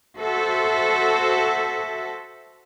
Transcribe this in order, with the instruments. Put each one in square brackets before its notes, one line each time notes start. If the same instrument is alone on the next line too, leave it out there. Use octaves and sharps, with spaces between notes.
[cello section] F#4 A4 C5 E5